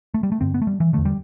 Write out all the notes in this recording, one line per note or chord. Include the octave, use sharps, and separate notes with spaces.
A3
G3
A3
G2 D3 C4
B3
A3
G3
E3
E2 D3 A3
G3